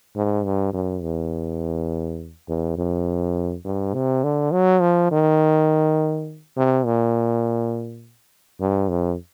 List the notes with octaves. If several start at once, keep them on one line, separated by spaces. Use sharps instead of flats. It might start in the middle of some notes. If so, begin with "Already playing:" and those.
G#2
G2
F#2
E2
E2
F2
G2
C3
D3
F#3
F3
D#3
C3
A#2
G2
F2